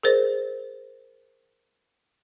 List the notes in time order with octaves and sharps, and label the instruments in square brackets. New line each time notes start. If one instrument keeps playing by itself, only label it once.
[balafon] G#4 A#4 C5 D5